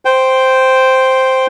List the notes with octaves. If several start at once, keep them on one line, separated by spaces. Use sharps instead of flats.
C5 G5